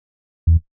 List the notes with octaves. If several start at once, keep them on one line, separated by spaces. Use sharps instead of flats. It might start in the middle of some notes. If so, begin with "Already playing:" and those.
E2